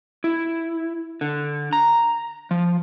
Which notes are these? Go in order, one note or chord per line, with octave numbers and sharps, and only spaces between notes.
E4
D3
A#5
F3